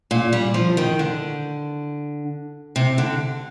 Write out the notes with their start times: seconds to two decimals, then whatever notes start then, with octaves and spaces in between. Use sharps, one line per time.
0.11 A#2
0.33 G3
0.54 F3
0.77 D#3
0.99 D3
2.76 C3
2.98 D3